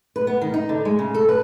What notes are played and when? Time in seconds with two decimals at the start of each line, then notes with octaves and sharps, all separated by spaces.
0.16 B4
0.27 B3
0.41 D#3
0.54 D#4
0.69 D3
0.85 G#3
0.99 C#3
1.14 A4
1.29 B4